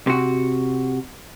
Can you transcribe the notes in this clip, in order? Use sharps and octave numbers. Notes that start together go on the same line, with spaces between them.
C3 F#4